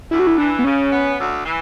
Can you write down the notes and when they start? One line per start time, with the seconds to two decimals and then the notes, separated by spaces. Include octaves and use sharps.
0.11 D2 E4
0.19 F#4
0.27 E4
0.38 E3 D4
0.59 B3
0.64 C#3 C#4
0.91 B3
1.18 D2
1.44 E3